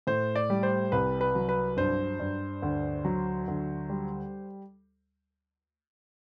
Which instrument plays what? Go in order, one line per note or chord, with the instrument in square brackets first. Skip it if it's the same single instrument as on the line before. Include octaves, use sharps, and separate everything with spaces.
[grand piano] A2 C5
D5
G3
C5
C2 B4
B4
F#3
B4
G2 C5
G2
D2
F#3
D2
G3